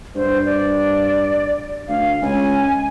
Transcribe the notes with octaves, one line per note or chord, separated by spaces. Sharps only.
G2 C5
D5
D2 F5
C#2 G#5